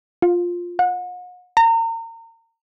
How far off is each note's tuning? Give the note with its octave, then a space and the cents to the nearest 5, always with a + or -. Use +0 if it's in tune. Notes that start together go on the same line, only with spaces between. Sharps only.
F4 +5
F#5 -40
A#5 -35